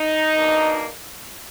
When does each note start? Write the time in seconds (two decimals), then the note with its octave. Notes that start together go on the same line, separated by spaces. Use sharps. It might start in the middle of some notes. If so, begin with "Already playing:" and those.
Already playing: D#4
0.34 B2 A#3 D4